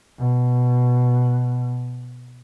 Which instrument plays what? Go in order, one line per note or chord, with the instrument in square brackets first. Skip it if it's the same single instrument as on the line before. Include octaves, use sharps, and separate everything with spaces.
[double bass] B2